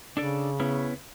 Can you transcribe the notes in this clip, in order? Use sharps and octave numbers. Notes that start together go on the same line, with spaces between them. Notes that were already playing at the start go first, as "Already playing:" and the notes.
C#3 D4 A4 D5
B3 C#4 E4